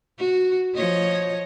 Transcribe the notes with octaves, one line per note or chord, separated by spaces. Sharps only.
F#4
F3 C#5 D#5